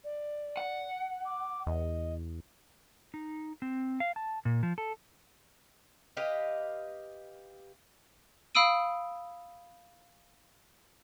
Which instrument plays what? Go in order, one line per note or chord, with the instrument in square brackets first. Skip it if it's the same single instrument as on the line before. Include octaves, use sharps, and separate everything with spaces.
[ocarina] D5
[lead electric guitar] F#5
[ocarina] D6
[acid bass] E2 [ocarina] D#5
[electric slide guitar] D#4
C4
F5
A5
A#2
F3
A4
[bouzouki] G4 B4 D#5 F5
[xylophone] F5 B5 D#6 E6 D7 D#7